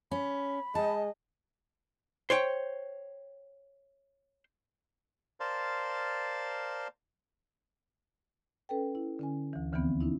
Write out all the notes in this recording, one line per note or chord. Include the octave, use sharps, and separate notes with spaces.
C#4 B5
G#3 D#5 A5
C5 C#5 G5
A#4 C5 D5 F5 A5 C6
C#4 A4 B4 G5
E4
D3 C#4 G#5
D2 E3
D#2 D3 E3 F3 B3 C4
C#4 D#4 E4